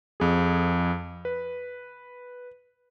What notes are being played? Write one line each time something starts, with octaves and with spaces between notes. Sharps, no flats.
F2 G#4
B4